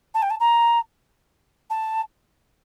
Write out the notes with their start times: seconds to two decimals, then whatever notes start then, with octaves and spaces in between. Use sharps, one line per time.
0.14 A5
0.22 G5
0.30 A5
0.40 A#5
1.70 A5